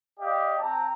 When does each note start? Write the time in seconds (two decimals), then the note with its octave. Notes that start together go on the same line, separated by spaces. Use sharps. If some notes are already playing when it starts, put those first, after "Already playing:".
0.20 G4 D5 D#5 F5
0.59 C4 G5 A5 A#5